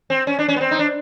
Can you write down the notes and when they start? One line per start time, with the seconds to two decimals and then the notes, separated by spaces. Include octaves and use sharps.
0.10 C4
0.27 C#4
0.39 D4
0.48 C#4
0.56 B3
0.61 C4
0.71 D#4
0.79 D4